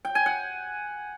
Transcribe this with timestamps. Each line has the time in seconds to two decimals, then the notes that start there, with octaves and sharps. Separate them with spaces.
0.05 G5
0.15 G#5
0.26 F#5